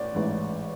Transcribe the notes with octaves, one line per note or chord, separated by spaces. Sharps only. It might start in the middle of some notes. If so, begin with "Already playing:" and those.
Already playing: A1 D5
A1 G#2 E3